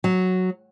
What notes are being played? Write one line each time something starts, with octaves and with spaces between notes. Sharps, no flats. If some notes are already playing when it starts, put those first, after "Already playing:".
F#3